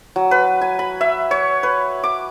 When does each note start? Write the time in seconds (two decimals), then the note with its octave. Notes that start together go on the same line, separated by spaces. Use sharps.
0.16 F#3
0.31 B4
0.61 G#5
0.79 B5
1.01 E5
1.31 C#5
1.63 B4
2.04 D6